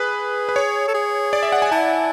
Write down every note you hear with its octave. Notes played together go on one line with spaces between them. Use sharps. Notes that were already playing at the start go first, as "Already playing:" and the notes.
Already playing: G#4 B4
B4
C#5
A4
G#4
D5
E5
F#5
G#5
E4 A5